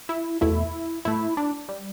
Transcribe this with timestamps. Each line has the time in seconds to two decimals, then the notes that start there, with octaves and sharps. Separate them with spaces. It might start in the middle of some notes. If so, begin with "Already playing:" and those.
0.09 E4
0.41 E2 B2 A3 E4
1.05 A2 A3 E4
1.37 D4
1.69 G3